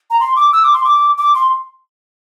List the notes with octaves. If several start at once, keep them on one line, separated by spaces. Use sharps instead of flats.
A#5
C6
D6
E6
D6
C6
D6
D6
C6